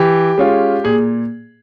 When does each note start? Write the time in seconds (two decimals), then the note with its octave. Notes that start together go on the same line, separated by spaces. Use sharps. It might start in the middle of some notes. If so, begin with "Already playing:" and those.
Already playing: E3 G4
0.38 G#3 C#4 F4
0.84 A#2 G#4